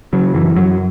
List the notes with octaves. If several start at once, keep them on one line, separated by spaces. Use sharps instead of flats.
C#3 F#3
F#2 E3
F#2 F#3